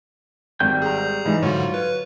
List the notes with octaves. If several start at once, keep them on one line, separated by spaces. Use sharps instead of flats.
G#1 G3 G5 G6
G#4 A#5
G#2 E3 D#4
G#2 D3 F#3 G3 F4 C#5
B4